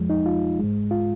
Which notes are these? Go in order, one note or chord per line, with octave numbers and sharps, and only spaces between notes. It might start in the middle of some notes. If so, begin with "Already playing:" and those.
Already playing: F2 F3 G#3
D#4
F4
G#2 G#3
F4